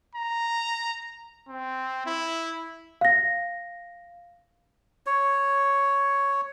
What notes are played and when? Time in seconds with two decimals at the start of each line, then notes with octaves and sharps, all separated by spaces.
0.15 A#5
1.49 C4
2.06 E4
3.01 F5 A#6
5.06 C#5